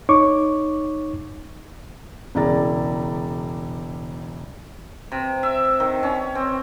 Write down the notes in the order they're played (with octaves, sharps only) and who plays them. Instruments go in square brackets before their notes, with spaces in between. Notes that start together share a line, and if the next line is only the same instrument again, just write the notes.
[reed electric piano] D#4 C#5 C#6 D6
[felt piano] E1 C#3 E4 D5 A#5 A6
[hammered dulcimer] C3
E5
D#3
C#4
C4